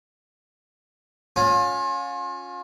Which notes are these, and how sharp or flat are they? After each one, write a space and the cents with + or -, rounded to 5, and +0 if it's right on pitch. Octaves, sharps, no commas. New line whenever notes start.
C#4 +0 F4 +35